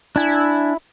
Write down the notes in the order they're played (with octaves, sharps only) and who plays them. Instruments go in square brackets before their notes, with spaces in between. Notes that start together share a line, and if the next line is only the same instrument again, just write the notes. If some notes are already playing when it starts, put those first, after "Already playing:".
[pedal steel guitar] D4 G#5 [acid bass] E4